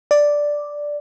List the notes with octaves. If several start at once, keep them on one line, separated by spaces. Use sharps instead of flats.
D5